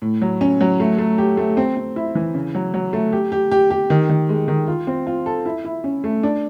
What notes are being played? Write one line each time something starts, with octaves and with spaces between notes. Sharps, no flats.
A2
F#3
C#4
F#3
A3
A3
G4
A3
C4
C4
E4
E3
C#3
F#3
F#3
A3
G4
G4
G4
G4
D#3
D#3
G#3
D#3
F4
C4
F4
A4
E4
E4
C#4
A3
D4